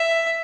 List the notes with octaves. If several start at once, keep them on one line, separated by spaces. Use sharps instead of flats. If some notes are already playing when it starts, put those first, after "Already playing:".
Already playing: E5